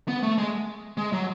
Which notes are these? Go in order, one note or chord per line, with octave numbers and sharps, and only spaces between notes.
B3
A3
G#3
G#3
F#3